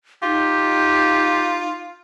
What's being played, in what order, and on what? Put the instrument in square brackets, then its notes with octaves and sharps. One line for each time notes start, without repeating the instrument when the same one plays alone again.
[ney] D#4 [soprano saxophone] F4 [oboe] G4